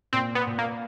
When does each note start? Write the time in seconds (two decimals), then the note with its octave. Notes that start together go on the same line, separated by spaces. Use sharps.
0.13 A#2 C4
0.35 B3
0.47 A#2
0.58 A#3